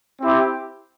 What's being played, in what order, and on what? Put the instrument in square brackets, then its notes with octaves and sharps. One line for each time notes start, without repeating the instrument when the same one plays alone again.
[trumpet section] C4 E4 G4